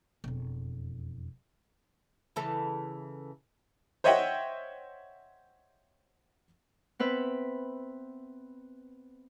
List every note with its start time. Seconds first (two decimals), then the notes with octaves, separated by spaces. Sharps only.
0.24 E1 F2
2.36 C#3 E3 A4
4.04 C5 C#5 D#5 E5 F#5 G5
6.99 B3 C4 B4 E5